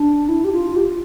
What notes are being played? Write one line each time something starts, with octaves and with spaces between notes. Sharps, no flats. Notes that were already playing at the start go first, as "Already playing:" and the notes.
Already playing: D4
E4
G4
F4
G4
F4